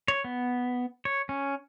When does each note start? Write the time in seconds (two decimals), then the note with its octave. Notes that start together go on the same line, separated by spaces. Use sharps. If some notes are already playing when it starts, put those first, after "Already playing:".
0.08 C#5
0.24 B3
1.05 C#5
1.29 C#4